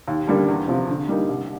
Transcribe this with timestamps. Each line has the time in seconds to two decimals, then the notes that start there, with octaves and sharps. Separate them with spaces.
0.08 D#2
0.28 D3 G3 A#3 D4
0.48 E2
0.68 C3 F3
0.89 D3
1.08 G3 A#3 D#4
1.29 C2